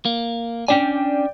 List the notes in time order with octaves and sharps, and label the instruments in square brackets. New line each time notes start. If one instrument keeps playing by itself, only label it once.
[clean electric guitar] A#3
[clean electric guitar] C#4 D4 G#5 [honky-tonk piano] D5 G5